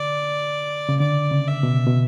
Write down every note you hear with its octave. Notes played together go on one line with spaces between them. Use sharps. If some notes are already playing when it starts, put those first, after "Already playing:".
Already playing: D3 D5
C#3
D3 D5
C#3
E5
B2
B2